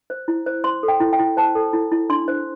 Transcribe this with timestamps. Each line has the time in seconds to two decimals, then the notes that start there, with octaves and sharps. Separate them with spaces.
0.10 C5
0.28 E4
0.46 C5
0.64 C5 C6
0.83 A4
0.88 G5
1.00 E4
1.13 G5
1.19 E4
1.37 C5 A5
1.55 A4
1.73 E4
1.92 E4
2.09 D4 C6
2.28 C5